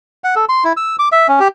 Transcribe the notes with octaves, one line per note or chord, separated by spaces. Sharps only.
F#5
A4
C6
E4
E6
D6
E5
C#4
G4